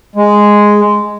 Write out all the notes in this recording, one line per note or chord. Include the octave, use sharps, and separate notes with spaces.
G#3